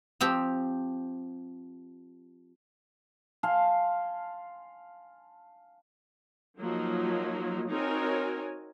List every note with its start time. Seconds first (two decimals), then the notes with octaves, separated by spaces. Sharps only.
0.21 F3 C4 G4
3.43 F5 G#5 A5 C6
6.60 F3 F#3 A#3 D#4
7.70 C4 D#4 F#4 A#4 C#5 G#5